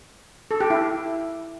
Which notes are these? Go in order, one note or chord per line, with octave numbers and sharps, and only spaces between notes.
A4
G4
E4